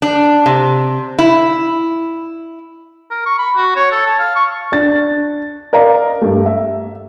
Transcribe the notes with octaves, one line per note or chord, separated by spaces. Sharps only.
D4
C3
E4
A#4
C#6
B5
F#4
C#5
A4
A5
F5
C#6
D4 A6
A#4 D5 D#5 F5 A#5
G2 A3
E5